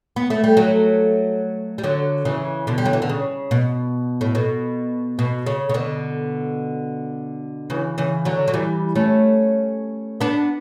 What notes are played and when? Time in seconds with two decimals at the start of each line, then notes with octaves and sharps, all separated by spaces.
0.16 B3
0.30 A3
0.44 G3
0.57 F#3 A3
1.78 G3
1.83 D3 F#3
2.25 C#3 E3
2.67 B2 D3
2.78 G3
2.85 F#3
2.93 E3
3.02 D3
3.09 C#3
3.51 B2
4.21 A2
4.35 B2
5.19 B2
5.46 C#3
5.69 C#3
5.74 B2 D3
7.70 C#3 E3
7.98 C#3 E3
8.25 D3 F#3
8.48 F#3
8.54 E3 G3
8.95 A3 C#4
10.21 B3 D4